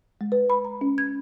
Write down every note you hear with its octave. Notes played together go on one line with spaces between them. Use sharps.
G#3
B4
B5
A#5
C#4
G#6